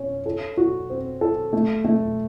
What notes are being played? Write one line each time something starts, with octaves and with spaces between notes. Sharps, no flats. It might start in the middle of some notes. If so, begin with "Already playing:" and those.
Already playing: C#4 C#5
A4
F#4
C4
A4
A3
A3